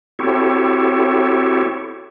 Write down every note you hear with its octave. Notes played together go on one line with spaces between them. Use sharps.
C4 E4 F#4 G4 A4 C#5